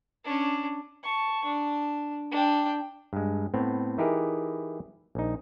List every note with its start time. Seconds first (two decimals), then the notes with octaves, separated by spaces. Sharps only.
0.25 C#4 D4
1.03 A5 C#6
1.44 D4
2.31 D4 G5
3.13 G2 G#3
3.54 A2 B3 C4
3.98 E3 D#4 E4 G4 G#4 A#4
5.15 A#1 D#4